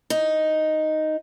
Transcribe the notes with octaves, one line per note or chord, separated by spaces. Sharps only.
D#4